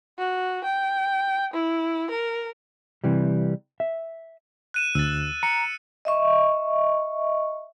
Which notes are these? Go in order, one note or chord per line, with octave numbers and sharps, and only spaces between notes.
F#4
G5
E4
A#4
C3 E3 G3
E5
F#6 D#7 E7
D2 E6 A6
A#5 C#7
D#5 E5 C#6